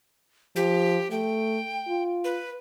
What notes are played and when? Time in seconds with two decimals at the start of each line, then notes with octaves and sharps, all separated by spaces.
0.56 F3 G4
1.11 A3 G5
1.88 F4
2.24 B4